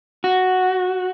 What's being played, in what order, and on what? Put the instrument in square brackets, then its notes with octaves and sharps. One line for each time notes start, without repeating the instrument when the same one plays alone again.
[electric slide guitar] F#4